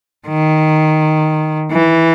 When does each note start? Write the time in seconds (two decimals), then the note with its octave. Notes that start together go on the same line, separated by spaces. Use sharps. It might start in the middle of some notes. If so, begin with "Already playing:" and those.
0.28 D#3
1.72 E3